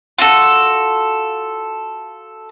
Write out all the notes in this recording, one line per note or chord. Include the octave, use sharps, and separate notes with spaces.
F4 F#4 A4